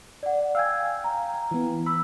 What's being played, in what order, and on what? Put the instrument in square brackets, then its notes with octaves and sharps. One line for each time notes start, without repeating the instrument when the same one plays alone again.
[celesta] D5 F#5
[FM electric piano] F5 G5 G#5 [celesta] E6 G#6
[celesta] A#5
[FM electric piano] E3 B3
[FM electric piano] B5 [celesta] E6